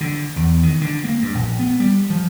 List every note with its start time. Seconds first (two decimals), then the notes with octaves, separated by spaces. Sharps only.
0.01 D3
0.36 E2
0.63 D#3
0.81 D3
1.04 A#3
1.22 G2
1.35 A#1
1.59 B3
1.80 G3
2.10 F3